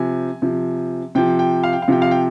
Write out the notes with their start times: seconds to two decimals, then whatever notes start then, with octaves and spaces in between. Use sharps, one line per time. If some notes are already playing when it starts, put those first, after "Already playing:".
Already playing: C3 F3 G#5
0.42 C3 F3
1.15 C3 F3 G5
1.39 G5
1.64 F5
1.73 G5
1.82 F5
1.88 C3 F3 G5
2.02 F5
2.11 G5